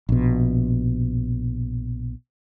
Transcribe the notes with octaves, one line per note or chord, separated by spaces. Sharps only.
A#1 B2